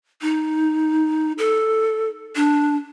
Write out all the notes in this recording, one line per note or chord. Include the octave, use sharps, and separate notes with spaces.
D#4
A4
D4